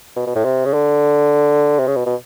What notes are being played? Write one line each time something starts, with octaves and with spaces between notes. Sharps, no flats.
B2
B2
A2
C3
C#3
D3
C3
C#3
B2
B2